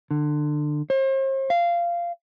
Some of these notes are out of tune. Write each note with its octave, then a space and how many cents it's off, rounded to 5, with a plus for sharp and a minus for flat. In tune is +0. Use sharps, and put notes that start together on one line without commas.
D3 +25
C5 +40
F5 -15